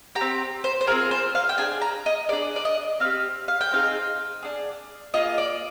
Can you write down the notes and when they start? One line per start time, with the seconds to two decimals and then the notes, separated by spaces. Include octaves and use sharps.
0.15 G4 A#5
0.21 C4
0.64 C5
0.81 C5
0.87 C4 F4 G#4 A#4
1.11 C5
1.35 F5
1.49 G5
1.58 D4 G#4 G#5
1.82 A#5
2.06 D#5
2.29 D4 G#4 D5
2.56 D5
2.65 D#5
3.00 C4 F5
3.05 G4
3.48 F5
3.61 G5
3.72 C4 D#4 G#4 F5
4.43 D4 G#4
5.14 A#3 F4 G#4 D#5
5.38 D5